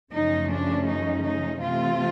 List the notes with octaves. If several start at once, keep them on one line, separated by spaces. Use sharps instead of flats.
F#2 C#3 F3 A3 C#4 D#4
D4
D#4
D#4
C3 E3 A3 C4 F4